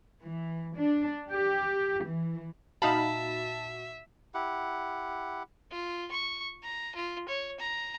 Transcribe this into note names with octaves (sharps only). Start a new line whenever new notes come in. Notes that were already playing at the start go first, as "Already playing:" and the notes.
E3
D4
G4
E3
A#2 D#4 F#4 E5 F5 A5 B5
E4 G4 F#5
F4
C#6
A#5
F4
C#5
A#5